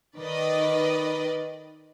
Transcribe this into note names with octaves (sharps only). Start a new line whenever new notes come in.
D#3 B4 D5 D#5